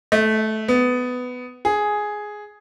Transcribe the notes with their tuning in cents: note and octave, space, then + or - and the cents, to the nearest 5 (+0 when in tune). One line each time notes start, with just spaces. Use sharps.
A3 -15
B3 +15
G#4 +5